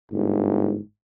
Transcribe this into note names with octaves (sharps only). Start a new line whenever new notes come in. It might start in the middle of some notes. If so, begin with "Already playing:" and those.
G1 G#2